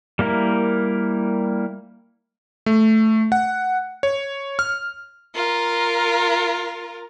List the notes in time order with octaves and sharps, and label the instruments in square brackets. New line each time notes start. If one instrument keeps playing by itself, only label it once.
[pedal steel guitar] G3 A#3 E4 A#4
[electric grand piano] A3
F#5
C#5
F6
[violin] F4 A#4